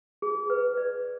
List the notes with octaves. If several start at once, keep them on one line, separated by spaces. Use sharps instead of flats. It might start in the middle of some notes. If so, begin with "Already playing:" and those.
G#4
B4
D5